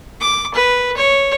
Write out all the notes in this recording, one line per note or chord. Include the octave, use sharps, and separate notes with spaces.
D6
B4
C#5